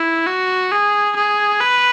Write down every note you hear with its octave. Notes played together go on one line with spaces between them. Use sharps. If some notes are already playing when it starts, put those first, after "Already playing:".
Already playing: E4
F#4
G#4
G#4
B4